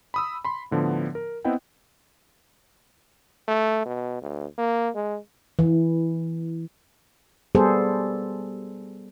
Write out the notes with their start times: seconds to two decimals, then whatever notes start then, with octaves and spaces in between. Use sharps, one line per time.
0.14 B5 D#6 E6
0.44 B5 C6
0.71 A2 D3 F3 B3
1.15 A#4
1.45 B3 C4 E4 D#5 F#5 G5
3.48 A3
3.85 B2
4.22 D2
4.58 A#3
4.95 G#3
5.59 E3
7.55 G3 B3 G#4 A4 C5